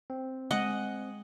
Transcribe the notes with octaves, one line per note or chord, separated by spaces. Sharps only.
C4
G#3 D#5 F#5